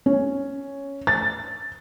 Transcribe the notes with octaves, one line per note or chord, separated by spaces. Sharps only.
C#4
A6